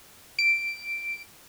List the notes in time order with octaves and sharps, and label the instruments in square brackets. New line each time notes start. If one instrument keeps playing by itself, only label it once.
[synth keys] D7